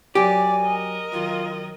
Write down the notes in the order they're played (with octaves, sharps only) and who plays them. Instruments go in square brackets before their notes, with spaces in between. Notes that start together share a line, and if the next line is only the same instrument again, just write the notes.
[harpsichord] F#2 F#3 [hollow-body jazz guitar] G4 [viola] D5 [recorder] G#5
[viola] A#4 D#5
[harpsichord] F#2 D#3 [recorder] F4